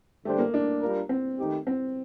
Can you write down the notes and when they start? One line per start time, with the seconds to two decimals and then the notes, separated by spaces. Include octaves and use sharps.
0.24 D3 G3 A3 D4 G4 C5
0.38 A#3
0.54 D4
0.81 G3 D4 F4 A#4
1.09 C4
1.39 D#3 A3 D#4 G4
1.67 C4